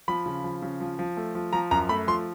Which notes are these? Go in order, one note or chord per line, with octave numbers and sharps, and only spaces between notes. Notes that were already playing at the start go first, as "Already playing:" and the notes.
F3 B5
C#3
F3
C#3
F3
F3
A3
F3
F3 A#5
F#2 A#5
A3 B5
F3 C6